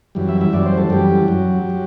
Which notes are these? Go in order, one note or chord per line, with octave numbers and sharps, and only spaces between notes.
F#2 E3 G3
E5
E5
F#2 E3 G3 D5
C5
A4
F#2 E3 G3 G4
F#2 F#3
F#3